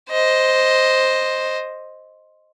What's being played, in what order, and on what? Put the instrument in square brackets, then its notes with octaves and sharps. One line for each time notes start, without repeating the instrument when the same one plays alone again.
[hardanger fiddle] C5 D#5